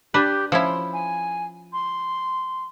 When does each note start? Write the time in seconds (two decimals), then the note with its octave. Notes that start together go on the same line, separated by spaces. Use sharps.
0.14 D4 G4 B4
0.52 F3 C#4 E4 C6
0.93 G#5
1.73 C6